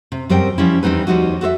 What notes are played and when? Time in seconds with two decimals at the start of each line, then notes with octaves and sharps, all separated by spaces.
0.12 C3
0.29 F#2 G3 C4 A#4 G5
0.58 F3 G3 C#4 E4
0.83 E2 G3 C4 D#4 B4
1.07 D#2 F3 G3 D#4 F#4
1.41 F#4 A4 C5 E5